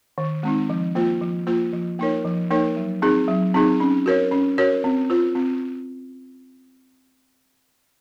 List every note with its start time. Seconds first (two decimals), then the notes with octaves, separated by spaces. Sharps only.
0.18 D#3
0.43 G#3 C4 D#4
0.70 F3
0.95 A#3 F4 C5
1.21 F3
1.47 A#3 F4 C5
1.73 F3
1.99 A#3 D#4 A#4 C#5
2.25 F3
2.50 A#3 D#4 A#4 C#5
2.77 F#3
3.02 C4 D#4 G#4
3.28 F#3
3.54 C4 D#4 G#4
3.80 C#4
4.06 F#4 A#4 C#5
4.31 C#4
4.58 F#4 A#4 C#5
4.84 C4
5.10 F4 C5
5.35 C4